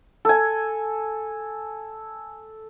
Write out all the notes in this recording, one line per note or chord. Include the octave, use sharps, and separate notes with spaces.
A4 G#5